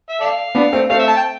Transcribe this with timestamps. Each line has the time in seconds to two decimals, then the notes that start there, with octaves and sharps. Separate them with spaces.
0.09 E5
0.20 A4 D5 F5
0.55 B3 D4
0.73 A3 C4
0.90 A3 C4 F5
0.99 E5
1.08 A5
1.17 G5